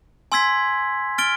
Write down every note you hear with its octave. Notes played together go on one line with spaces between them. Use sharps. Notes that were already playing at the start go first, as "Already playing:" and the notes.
G#5 C6 E6 G#6 B6
F6 A6 D7 G7